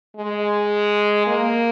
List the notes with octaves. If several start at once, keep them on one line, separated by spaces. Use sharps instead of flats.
G#3
A#3